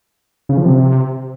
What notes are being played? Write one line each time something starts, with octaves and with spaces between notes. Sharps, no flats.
C#3
F3
C3